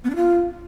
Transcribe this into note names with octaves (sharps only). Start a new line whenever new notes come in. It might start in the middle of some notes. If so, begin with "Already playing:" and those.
B3
D4
F4